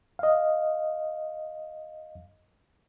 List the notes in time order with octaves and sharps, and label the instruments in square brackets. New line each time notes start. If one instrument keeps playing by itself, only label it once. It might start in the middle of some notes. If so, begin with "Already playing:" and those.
[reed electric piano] D#5 F5